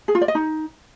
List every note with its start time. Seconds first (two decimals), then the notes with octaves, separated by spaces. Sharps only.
0.08 G#4
0.15 F4
0.21 D5
0.28 D#5
0.35 D#4